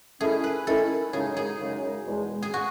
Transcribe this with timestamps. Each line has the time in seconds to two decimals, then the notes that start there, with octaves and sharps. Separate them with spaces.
0.21 D#3 A3 C#4 E4 G#4
0.44 B4
0.67 D#3 A3 C#4 E4 A4
1.13 F#2 C#3 G#3 D#4 G#4
1.37 G#4
1.60 F#2 C#3 G#3 D#4
2.07 E2 B2 G#3
2.42 G#4
2.54 F#4